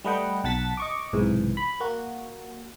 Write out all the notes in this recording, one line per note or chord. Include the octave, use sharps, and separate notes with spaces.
G3 A3 B4 D#5 F#5 G5
B1 F#5 A5 A6 B6
D#5 C#6 D6
B1 G#2 C3 E3
B5
A#3 F#4